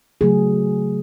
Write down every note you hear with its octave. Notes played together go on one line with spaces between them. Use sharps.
C#3 F#3 A3 G#4